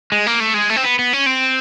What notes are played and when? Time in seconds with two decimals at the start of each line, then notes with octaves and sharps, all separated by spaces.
0.12 G#3
0.27 A#3
0.40 A3
0.54 G#3
0.70 A3
0.77 C4
0.84 B3
0.99 B3
1.13 C#4
1.26 C4